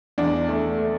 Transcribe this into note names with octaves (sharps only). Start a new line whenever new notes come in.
E2 D4
A3
A3